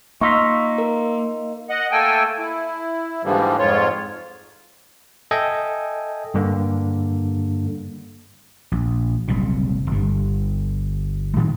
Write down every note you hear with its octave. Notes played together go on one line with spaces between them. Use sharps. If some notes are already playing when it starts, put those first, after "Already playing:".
A#3 D#4 F4 C#6 E6 B6
A#4
D#5 F#5
A3 A#3 A4 G5 G#5
E4
G#2 D3 E3 F3 G3 A#3
F2 G#2 F4 C#5
A4 D#5 E5 G5 G#5
G2 D3 A#3
A#1
F#1 C2 A#2
G1 G2
A2 D#3 F3 G3